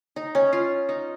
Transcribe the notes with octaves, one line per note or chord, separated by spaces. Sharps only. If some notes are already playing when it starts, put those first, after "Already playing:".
D#4
C#4
F4
D#4